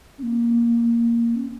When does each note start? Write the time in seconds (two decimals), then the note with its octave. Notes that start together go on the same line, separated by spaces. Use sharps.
0.18 C#4
0.22 A#3
1.35 C#4